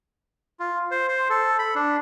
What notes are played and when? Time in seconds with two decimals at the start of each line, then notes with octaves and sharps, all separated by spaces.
0.60 F4
0.91 C5
1.08 C5
1.30 A4
1.59 B5
1.75 D4